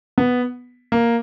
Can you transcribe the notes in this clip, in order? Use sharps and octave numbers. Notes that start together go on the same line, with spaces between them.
B3
A#3